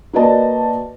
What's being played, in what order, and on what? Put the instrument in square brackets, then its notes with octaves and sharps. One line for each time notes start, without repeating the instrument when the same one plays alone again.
[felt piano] A#3 F#4 B4 D5 D#5 A5